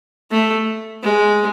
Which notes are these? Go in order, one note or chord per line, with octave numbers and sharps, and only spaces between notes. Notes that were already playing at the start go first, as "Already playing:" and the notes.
A3
G#3